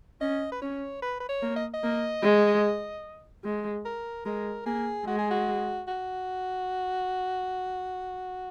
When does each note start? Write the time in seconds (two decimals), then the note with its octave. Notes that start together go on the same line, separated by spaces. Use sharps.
0.21 C#4 D#5
0.52 B4
0.61 C#4 C#5
1.02 B4
1.20 B4
1.29 C#5
1.42 A#3
1.56 D#5
1.74 D#5
1.83 A#3
2.23 G#3
3.44 G#3
3.85 A#4
4.25 G#3 A#4
4.66 A#3 G#4
5.06 G#3 F#4
5.18 G#4
5.31 F#4
5.88 F#4